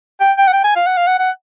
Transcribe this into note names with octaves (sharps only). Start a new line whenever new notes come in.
G5
G5
F#5
G5
G#5
F5
F#5
F5
F#5
F#5